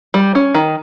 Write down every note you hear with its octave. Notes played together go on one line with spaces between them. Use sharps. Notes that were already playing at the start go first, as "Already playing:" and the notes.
G3
C#4
D#3